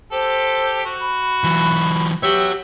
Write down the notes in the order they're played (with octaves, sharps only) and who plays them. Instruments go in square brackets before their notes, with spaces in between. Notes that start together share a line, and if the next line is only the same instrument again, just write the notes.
[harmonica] G4 A4 [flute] C5
[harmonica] F#4
[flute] B5
[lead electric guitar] E3 F#3
[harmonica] B3 E5 G5 [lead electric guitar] F#4 C#5 [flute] G4